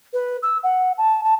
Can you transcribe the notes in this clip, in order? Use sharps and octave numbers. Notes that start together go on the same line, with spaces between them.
B4
E6
F#5
A5
A5